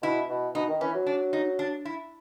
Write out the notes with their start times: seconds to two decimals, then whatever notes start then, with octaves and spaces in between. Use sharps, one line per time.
0.02 B2 E4
0.29 B2
0.55 B2 D#4
0.68 D#3
0.81 E3 C#4
0.94 F#3
1.06 D4
1.33 D#4
1.59 D4
1.85 E4